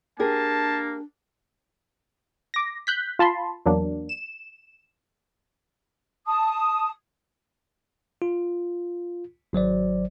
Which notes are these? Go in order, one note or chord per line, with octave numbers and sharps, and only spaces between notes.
A#3 D4 G4 G#4 A#4 A5
D6 A#6
F#6 G6 B6
F4 A5 B5 C6
E2 F#3 A#3 D4
E7
A5 D#6
F4
G#1 F#3 C5 D5